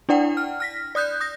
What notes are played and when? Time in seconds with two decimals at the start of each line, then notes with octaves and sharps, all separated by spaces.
0.09 D4 E4 D5 F#5 G5
0.37 F6
0.60 F6 A#6 B6
0.95 D5 D#6 F#6 G6
1.21 D#6 G6 A#6